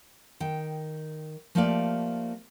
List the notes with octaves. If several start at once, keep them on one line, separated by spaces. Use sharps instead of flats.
D#3 G5
F3 A3 A#3 F4 G4 D5